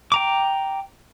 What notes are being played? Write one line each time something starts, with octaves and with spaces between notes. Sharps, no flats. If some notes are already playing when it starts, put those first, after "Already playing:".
G5 A#5 D6